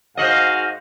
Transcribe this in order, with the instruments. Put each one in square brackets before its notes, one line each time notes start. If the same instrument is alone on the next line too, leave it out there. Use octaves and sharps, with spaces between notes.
[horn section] G#2 F#4 F5 [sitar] C5 D#5